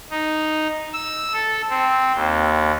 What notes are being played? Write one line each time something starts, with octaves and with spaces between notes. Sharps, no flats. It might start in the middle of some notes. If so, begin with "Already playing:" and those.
D#4
E6
A4
C4
D#2